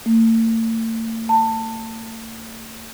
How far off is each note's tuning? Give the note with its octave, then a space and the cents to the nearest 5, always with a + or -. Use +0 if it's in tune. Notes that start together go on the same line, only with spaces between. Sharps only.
A3 +45
A5 +20